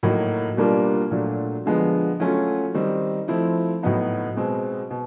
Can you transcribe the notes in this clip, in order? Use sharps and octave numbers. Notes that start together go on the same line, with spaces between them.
A2 F#3 A#3 D#4
B2 G3 A#3 D4 F4
A#2 F#3 A3 D4
D3 F3 G#3 B3
F#3 A3 C#4 F4
D#3 G3 C4 D#4
F3 A3 C4 E4
A2 F#3 B3 D#4
B2 G#3 C4
B2